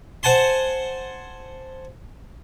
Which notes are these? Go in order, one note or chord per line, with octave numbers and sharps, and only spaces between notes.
C5 F#5 G#5 A5 C6